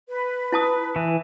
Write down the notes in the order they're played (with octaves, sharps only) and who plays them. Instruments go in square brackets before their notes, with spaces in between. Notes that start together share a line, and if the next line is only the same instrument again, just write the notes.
[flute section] B4
[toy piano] E4 A5 D#6
[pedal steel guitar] E3